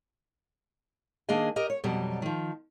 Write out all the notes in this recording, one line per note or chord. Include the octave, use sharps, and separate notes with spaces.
D#3 A#3 D4 G#4 D#5 G#5
G4 A#4 D#5
C#5
F2 B2 F#3 G3
D#3 F3